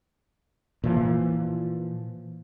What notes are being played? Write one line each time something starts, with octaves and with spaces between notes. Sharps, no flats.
A#2 E3 F3